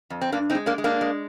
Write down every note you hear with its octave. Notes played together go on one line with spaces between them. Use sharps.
F2
C4
G2 A#3 D4
C4 D#4
G#3
A#3 D4
G#3
A#3 D4
G#3